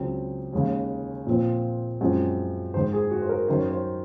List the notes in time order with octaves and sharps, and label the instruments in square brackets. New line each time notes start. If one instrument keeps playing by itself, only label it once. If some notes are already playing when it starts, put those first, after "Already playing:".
Already playing: [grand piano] C#2 C#3 F#3 C4
D#2 C#3 G#3 C#4
A#2 F3 C4
F#2 F3 G#3 C4
G#2 D#3 G#3 C5
G#4
F#4
C5
A#4
F#2 D#3 F#3 C#4 C5
C#5
C5